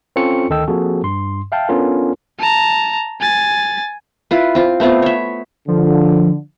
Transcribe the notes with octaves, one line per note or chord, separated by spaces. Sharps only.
C4 C#4 F4 A4 C#6 C#7
D2 D#3 A4 D#5 G5 E6
F3 A#3 C4 F#4 G#4 A4
G2 C6
E5 F5 G5 A5
B3 C#4 D4 F4 A4 A#4
A5 A#5
G#5 A6
E4 F4 B4
C4 F4
A3 B3 C4 F4
C#5 E5
D3 F3